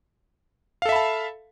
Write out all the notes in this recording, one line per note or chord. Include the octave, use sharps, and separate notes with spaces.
A4 E5 F5 A5 B5